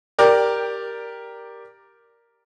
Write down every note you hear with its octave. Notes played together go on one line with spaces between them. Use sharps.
G4 A#4 D5